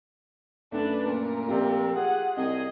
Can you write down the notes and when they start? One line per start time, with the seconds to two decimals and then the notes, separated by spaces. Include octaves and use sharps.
0.72 F#2 A3 D4 B4
1.06 A#2 A#4
1.48 F3 A3 C4 F4 G4 D5
1.96 G#4 F#5
2.37 C2 G#4 D#5